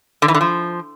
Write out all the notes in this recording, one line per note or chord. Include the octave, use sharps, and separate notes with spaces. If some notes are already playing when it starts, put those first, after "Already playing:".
D3
E3
D3
F3